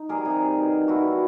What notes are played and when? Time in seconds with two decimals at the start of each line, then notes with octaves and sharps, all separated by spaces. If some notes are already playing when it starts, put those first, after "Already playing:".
Already playing: D#4
0.09 D#3 G3 G#4 A#4
0.25 C3 G#4 A#4
0.41 D#3 G3
0.57 B2
0.73 G3
0.88 B2 E4 F#4
1.05 G3